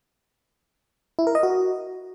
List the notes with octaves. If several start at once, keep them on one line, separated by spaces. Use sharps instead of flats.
E4
A#4
D#5
F#4